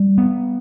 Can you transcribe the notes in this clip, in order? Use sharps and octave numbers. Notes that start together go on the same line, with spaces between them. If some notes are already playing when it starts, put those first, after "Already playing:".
Already playing: G3
B3